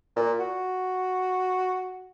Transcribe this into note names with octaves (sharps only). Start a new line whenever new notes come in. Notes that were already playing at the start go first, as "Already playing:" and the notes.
A#2
F#4